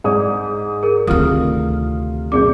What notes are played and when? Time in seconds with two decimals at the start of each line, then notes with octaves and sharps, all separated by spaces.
0.04 G#2 G#4 D5 D#6
0.83 G#4 A#4
1.07 D2 C3 D#3 F4 D#6 F6
2.32 F#2 B2 G#4 D5 D6 G6